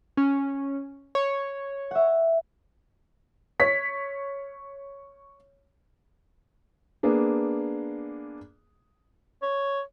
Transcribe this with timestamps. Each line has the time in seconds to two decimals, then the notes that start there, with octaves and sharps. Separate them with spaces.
0.17 C#4
1.15 C#5
1.91 E5 F#5
3.59 C#5 B6
7.03 A#3 B3 D4 G#4
9.42 C#5